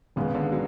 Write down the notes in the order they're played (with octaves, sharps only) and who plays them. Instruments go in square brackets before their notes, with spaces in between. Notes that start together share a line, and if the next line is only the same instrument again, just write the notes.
[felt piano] G#1 G#2 G#3 B3 [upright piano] C#3
[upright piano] D3
F#3